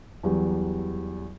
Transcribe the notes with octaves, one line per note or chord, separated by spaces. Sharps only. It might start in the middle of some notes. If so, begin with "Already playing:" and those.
E2 F#3 G3